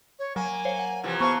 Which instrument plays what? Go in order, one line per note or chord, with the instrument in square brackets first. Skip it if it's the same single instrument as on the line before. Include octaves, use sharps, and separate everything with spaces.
[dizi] C#5
[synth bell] F#3 [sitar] A#3 [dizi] G#5
[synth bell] C5 C#5 F5
F#5
[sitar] C3 E3 F3
[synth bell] B3 A5 [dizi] C5 [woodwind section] F5 C#6